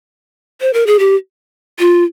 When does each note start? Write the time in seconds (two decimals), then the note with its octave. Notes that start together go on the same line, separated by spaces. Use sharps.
0.61 C5
0.73 A#4
0.87 G#4
0.99 G4
1.79 F4